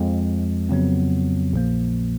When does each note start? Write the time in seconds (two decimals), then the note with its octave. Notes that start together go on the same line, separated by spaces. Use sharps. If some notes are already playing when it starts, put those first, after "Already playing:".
Already playing: F2 F3 G#3
0.69 F2 C#3 F#3 B3
1.53 A#1 A#2 F3 A#3